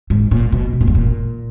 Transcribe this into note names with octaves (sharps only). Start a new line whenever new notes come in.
G#2
A#2
B2
B2
A#2
G#2
A#2